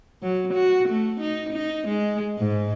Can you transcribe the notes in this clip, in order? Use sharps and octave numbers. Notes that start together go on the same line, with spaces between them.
F#3
F#4
A3
D#4
D#4
G#3
G#2